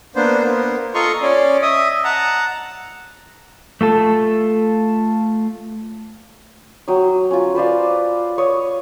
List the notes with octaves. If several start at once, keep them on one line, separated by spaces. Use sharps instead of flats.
A#3 B3 D4 C5
A#3 B3
F4 A4 D#5 A#5 C6 C#6
C#4 D5
D#5 E5 D#6
F#5 A5 A#5
A3 F4 A4
F#3 G5 D#6
C#4 F4
B4 C5 D5 F5
C#5 D#6